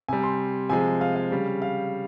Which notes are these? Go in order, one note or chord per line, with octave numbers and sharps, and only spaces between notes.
C3 G3 G#5
C6
C3 F3 G#3 G#5
F5
F5
C#3 G3
F5